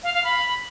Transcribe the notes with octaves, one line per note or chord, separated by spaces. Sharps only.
F5
F5
B5